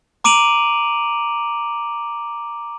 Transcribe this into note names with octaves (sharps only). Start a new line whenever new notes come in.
A#5 D6 D7 D#7 F7 F#7